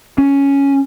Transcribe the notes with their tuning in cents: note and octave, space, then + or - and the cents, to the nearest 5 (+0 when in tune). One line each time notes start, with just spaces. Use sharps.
C#4 +5